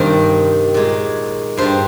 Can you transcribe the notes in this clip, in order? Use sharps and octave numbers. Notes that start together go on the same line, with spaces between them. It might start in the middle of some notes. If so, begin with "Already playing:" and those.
Already playing: G2 C3 D#3 G3 C5
A#2 G#3
G2 G3 C5